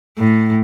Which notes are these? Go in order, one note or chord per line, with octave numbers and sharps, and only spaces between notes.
A2